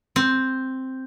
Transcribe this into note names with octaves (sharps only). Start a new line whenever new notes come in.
C4